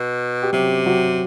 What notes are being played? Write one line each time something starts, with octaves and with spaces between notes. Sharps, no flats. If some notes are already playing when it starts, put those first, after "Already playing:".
Already playing: B2
G4
C3 F#3 F#4
F#3 F#4